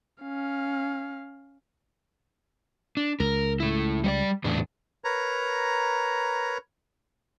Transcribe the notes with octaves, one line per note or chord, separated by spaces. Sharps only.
C#4 F5
D4
C#2 A#4
A3 E4
G3 C#5 D5
E2 A2 D4
A#4 B4 C#5 A#5